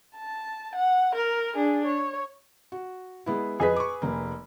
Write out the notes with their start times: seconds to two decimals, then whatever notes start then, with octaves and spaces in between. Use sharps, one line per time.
0.16 A5
0.75 F#5
1.15 A#4
1.55 D4 G#4
1.86 C#5
2.72 F#4
3.26 G#3 B3 E4
3.60 F2 G#4 B4 D#5 B6
3.76 C#6 D6
4.02 F1 A#3